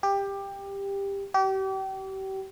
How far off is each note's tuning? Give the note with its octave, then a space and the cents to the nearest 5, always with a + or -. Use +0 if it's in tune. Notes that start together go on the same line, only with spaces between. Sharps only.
G4 +15
G4 -35